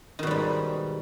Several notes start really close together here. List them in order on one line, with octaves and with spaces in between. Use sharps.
D#3 B2 G3 G#2